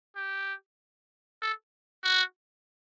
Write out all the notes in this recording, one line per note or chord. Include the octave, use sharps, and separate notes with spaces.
G4
A4
F#4